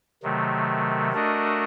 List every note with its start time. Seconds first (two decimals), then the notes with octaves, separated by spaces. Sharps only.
0.23 C3 D#3 F#3 A3
1.13 A3 D4 F#4 A#4 D#5